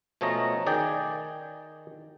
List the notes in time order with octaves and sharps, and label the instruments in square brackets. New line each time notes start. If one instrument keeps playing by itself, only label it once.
[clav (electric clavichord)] B2 F3 A3 C#4 D#5 A#5
D#3 G#4 D5 G5